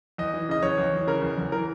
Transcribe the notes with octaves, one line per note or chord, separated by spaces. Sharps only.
E2 D#5
E3
C#3 D#5
E2 C#5
E2
E3
C#3 A#4
E2
E2
E3 A#4